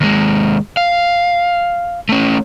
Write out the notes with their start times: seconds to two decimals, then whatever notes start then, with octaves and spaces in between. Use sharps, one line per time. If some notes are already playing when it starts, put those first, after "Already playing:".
0.01 D#2 G#3
0.77 F5
2.09 A3 C#4